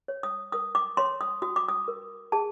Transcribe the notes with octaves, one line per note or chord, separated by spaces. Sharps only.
C#5
D#6
A#4 D#6
D6
C#5 C6
D#6
F#4 D#6
D6
D#6
A#4
G#4 A5